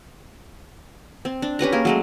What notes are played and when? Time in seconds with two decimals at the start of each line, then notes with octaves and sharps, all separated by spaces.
1.25 C4
1.42 D4
1.59 C#4 G4 B4 A#5
1.72 A#3 G#4 A#4
1.85 F#3 G#3 A3